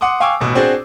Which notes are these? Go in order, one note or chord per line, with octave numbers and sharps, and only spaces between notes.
F#5 C6 D6 D#6
F5 G5 G#5 C#6 D6 E6
A1 B2
C4 D4 F#4 G#4 C5 D5